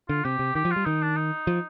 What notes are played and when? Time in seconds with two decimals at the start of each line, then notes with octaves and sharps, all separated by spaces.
0.09 D3 F4
0.24 C3 G4
0.39 C3
0.55 D#3 G4
0.65 F3
0.71 F4
0.76 G3
0.85 D#3 D#4
1.02 D4
1.16 D#4
1.47 F3